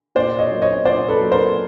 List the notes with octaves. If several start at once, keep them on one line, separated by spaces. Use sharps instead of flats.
A#2 C5 D5
C#5 D#5
F#3 A#3
C#5 D#5
A#2 C5 D5
A4 B4
F#3 A#3
A#4 C5